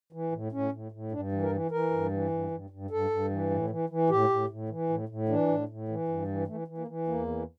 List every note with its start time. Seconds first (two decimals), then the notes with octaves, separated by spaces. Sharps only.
0.13 E3
0.32 A2
0.52 A2 C#4
0.72 A2
0.92 A2
1.12 G2 D4
1.32 E3
1.42 A#4
1.51 E3
1.71 E3 A#4
1.91 G2
2.11 E3
2.31 G2
2.51 G2
2.70 G2
2.90 G2 A4
3.10 G2
3.30 E3
3.50 A2
3.70 E3
3.89 E3
4.10 A2 G4
4.29 A2
4.49 A2
4.69 E3
4.89 A2
5.09 A2
5.28 E3 D4
5.48 A2
5.69 A2
5.88 E3
6.08 G2
6.28 E3
6.47 E3 A3
6.68 E3
6.78 A#3
6.87 E3
7.07 E2 A#3
7.27 E3